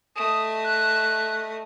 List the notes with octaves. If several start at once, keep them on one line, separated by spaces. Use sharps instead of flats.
A3 D#5 D#6
F#6